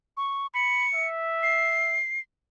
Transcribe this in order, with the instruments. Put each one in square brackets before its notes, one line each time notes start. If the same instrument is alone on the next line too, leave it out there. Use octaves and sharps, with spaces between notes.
[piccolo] C#6
[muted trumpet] B5 [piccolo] C#7
[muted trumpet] E5
[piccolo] C7